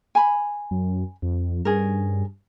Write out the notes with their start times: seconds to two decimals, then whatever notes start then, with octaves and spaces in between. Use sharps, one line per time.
0.15 G#5 B5
0.71 F#2
1.22 F2
1.65 G2 C#4 G#4 A#4